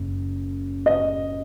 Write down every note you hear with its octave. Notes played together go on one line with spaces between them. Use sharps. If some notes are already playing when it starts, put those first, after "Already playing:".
Already playing: F#1 F#2
D#5